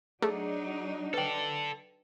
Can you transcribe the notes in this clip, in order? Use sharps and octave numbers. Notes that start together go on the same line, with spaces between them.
F#3 A3 D4 D#4 G#4
A4 B4 D5 G5